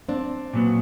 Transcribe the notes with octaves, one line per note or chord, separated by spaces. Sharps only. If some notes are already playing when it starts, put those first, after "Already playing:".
C4 D4
A#2 F#3 B3